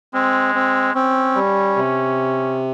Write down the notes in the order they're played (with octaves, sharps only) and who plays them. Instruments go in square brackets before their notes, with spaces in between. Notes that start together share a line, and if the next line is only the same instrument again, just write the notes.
[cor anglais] G#3 [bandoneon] C4
[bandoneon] C4
[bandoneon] C4 [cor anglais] C#4
[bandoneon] G3
C3